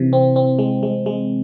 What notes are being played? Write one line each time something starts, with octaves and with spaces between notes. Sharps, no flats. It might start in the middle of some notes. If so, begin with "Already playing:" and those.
Already playing: C3 E3
C4
C4
G#3
G#3
G#3